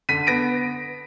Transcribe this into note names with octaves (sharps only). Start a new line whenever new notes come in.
D3 B6 D#7
B3 A#6 D7